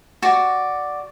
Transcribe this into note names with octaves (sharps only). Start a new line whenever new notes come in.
F#4 D5